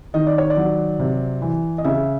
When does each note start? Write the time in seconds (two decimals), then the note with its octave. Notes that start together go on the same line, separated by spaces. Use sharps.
0.14 D#3 D#5
0.27 D5
0.38 C#5
0.50 D5
0.57 F#3
0.99 C3
1.42 E3
1.78 D#5
1.84 C#3 E5